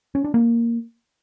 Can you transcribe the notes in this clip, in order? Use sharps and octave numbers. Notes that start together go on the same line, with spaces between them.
C#4
D4
A#3